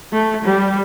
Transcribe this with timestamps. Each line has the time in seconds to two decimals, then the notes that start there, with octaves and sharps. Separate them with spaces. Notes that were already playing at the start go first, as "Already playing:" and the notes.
0.13 A3
0.44 G3